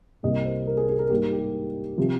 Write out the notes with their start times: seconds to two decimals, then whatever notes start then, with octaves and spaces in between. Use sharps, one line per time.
0.23 C2 C3 G3 A#3 D#5
0.45 C5
0.67 A#4
0.77 G#4
0.89 G#4
0.99 A#4
1.10 G#2 G3 A#3 G4
1.33 G4
1.98 C3 F3